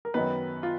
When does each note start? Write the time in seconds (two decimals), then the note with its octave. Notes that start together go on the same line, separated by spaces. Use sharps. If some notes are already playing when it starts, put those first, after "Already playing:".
0.05 A#4
0.14 F#2 D#3 F#3 B3 D#4 B4
0.63 F4